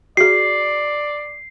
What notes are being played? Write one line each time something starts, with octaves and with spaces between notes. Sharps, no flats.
F#4 G#4 D5 C7